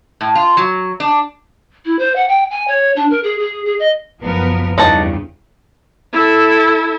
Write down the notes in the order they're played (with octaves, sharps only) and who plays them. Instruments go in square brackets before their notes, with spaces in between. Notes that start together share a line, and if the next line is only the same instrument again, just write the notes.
[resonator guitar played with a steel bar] A2
F4
F#3
D4
[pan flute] E4
C5
F#5
G5
G#5
C#5
D4
A#4
G#4
G#4
G#4
D#5
[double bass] F#1 F3 [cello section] B3 A#4
[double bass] E2 [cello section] G2 C#3 [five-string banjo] D#4 F#5 A5
[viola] E4 A4